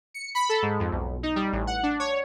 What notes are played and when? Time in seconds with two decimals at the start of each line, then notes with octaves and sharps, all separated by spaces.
0.14 C#7
0.35 B5
0.49 A4
0.62 G#2
0.80 F2
0.92 B1
1.23 D#4
1.36 G3
1.52 A1
1.67 F#5
1.83 D4
2.00 C#5